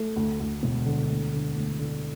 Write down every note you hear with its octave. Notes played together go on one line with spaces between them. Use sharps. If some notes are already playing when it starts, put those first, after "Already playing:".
Already playing: A3
D2
D2
E1
D3
D2
D3
D2
D3